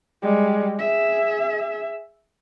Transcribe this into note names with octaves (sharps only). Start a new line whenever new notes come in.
G3 G#3
G#4 E5